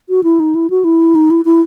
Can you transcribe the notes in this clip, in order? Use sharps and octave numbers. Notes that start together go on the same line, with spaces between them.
F#4
E4
D#4
E4
F#4
E4
D#4
E4
E4